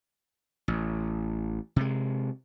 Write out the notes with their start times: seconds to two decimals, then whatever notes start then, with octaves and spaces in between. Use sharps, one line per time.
0.68 A1
1.76 C3 G#3